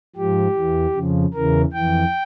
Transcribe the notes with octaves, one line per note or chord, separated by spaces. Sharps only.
G#2 F3 G4
E2 E3
F2 C#3 F3
E2 C#3 E3 A#4
F2 E3 G5